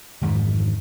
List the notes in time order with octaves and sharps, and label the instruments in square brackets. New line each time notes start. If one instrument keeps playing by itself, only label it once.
[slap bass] F2 G#2 D#3 E3